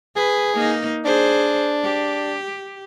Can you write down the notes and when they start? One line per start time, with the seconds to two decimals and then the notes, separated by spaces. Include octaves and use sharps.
0.16 G#4 B4
0.55 A#3 D#4
1.05 D4 G#4 C5
1.84 G4